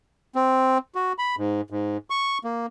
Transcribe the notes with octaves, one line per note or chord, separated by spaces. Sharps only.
C4
F#4
B5
G#2
G#2
C#6
A#3